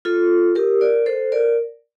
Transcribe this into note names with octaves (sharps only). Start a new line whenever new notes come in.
F4 A4
G4 A#4
A#4 D5
A4 C5
A#4 D5